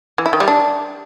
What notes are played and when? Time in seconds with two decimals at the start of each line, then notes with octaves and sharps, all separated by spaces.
0.18 E3
0.26 E4
0.33 D#3
0.40 G3
0.48 D4